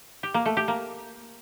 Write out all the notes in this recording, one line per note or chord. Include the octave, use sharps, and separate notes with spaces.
G4
A#3
A3
G4
A#3